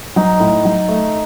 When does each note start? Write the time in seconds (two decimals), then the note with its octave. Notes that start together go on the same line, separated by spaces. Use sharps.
0.16 F#3 D#4
0.40 A2
0.65 F#3
0.88 A3